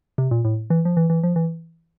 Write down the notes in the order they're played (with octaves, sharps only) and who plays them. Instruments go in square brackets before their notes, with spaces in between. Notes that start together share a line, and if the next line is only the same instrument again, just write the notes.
[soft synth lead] C3
A#2
A2
E3
F3
E3
E3
F3
E3